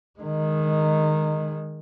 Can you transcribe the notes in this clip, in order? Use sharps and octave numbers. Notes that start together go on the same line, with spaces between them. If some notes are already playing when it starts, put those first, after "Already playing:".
D#3 G#3